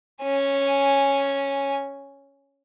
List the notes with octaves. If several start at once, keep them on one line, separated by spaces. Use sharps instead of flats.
C#4 G#5